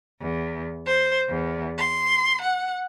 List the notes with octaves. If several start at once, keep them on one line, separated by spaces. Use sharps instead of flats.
E2
C5
E2
C6
F#5